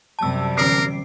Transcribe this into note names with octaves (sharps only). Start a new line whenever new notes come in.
F#2 C3 G3 A5 E6
D3 E3 C#4 A#4 D6 C7 D7